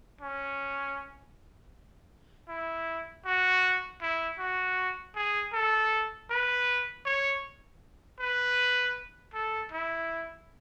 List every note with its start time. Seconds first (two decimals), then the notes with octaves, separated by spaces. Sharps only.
0.21 C#4
2.49 E4
3.26 F#4
4.02 E4
4.39 F#4
5.16 G#4
5.53 A4
6.30 B4
7.06 C#5
8.20 B4
9.34 A4
9.72 E4